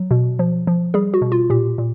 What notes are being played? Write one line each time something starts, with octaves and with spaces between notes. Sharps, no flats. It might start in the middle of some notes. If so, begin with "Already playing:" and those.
Already playing: F#3
B2
F3
F3
G3 G#4
F#4
B2
F4
A#2 G4
A#2